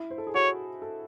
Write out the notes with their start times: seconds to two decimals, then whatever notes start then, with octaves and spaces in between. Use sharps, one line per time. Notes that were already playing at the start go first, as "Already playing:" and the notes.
Already playing: E4
0.10 C5
0.18 A4
0.27 G#4
0.34 F#4 C#5
0.82 A4